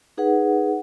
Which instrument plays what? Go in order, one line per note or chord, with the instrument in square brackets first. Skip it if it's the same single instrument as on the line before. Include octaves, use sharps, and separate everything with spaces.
[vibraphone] D#4 G#4 B4 F#5